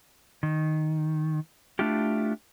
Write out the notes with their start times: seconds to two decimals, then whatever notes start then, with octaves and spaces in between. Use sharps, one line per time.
0.43 D#3
1.79 A3 D4 E4 F4 G4